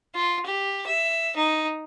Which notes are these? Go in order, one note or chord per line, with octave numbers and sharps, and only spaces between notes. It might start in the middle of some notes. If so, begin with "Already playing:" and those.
F4
G4
E5
D#4